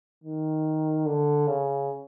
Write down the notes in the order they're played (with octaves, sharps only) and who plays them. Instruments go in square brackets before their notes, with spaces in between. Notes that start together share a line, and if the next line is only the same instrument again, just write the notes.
[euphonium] D#3
D3
C#3